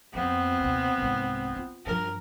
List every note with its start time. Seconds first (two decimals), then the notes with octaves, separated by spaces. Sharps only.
0.14 F2 B3 C4
0.60 D#2 C3
0.98 C2 G#2
1.55 F4
1.86 G2 F3 A#4